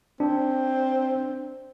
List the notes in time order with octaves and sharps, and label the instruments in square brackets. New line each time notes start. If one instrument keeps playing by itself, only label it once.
[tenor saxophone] C4 [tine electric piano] D4